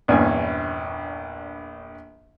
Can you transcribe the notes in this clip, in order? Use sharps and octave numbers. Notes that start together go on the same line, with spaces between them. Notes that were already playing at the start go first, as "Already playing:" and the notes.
A#1 E2 G2 E3 C#4 G#5